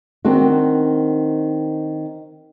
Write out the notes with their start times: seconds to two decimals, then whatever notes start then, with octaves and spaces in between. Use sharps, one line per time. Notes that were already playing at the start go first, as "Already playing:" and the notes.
0.25 D#3 C4 D4 F#4